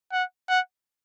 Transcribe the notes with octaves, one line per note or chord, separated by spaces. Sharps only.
F#5
F#5